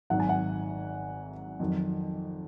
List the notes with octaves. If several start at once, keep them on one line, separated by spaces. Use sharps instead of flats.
G#1 G#2 D#3 F#3 F#5
G#5
F#5
F2 D#3 F#3